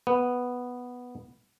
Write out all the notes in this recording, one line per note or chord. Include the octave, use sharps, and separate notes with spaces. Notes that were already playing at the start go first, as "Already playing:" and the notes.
B3